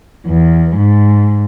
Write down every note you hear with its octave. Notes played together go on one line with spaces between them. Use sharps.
E2
G#2